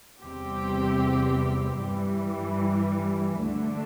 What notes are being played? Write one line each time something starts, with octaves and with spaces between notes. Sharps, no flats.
E2 C3 G3 C4 G4
G2 E3 G3
D2 D3 A3 D4